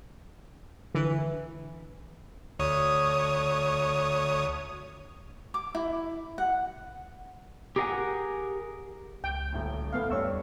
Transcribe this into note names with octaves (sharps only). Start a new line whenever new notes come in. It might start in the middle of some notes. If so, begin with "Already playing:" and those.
D3 E3 B4
D2 C#5 D#6
D6
E4
F#5
G4 G#4 A#4 D5 F#5 G#5
C#2 G5
D#1 A1 D2
A3 B3 F5
E2 G2 G3 C#5 C#6 E6